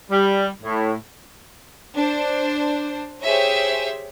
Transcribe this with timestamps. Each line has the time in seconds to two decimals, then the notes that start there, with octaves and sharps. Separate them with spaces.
0.11 G3
0.62 A2
1.95 D4 C5
3.23 G4 G#4 C5 C#5 E5